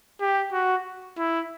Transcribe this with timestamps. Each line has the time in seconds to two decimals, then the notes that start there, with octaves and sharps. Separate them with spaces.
0.21 G4
0.53 F#4
1.18 E4